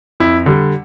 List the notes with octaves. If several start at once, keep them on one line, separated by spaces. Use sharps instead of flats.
F2 E4
D3 G3